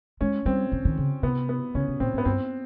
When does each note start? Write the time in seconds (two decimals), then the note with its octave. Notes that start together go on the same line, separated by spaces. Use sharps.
0.21 G#3 C#4
0.46 G3 C4
0.72 F3
0.85 D#3
0.98 C#3
1.23 C3 B3
1.49 B3
1.75 C#3 C#4
1.88 C3
2.00 A#2 C4
2.13 G#2
2.18 B3
2.25 G2 C4